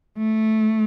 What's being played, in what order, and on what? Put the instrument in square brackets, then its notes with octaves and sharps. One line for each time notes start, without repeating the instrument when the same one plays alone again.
[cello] A3